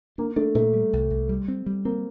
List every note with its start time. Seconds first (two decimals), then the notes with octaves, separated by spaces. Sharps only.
0.18 A#3 D4
0.36 A3 D4
0.55 A#2 A3
0.73 G3
0.93 C2
1.10 C2
1.29 G3
1.48 C4
1.66 G3
1.85 A#3 C4